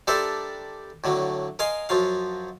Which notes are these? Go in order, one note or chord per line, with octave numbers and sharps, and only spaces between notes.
G3 D4 A4 A#4 C5 E5
A2 D3 F#3
A#4 D#5 F5 G#5 C6
F#2 F3 F#3 F5